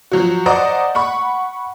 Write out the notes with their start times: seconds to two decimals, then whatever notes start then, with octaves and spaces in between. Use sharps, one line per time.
0.11 F3 F#3 F#4
0.46 C5 D5 D#5 F#5 A#5 D6
0.95 F#5 B5 C#6